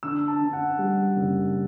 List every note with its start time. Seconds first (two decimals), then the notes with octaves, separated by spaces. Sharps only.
0.03 D3 E6
0.28 A5
0.41 D3
0.53 F#5
0.79 G3
1.16 F#1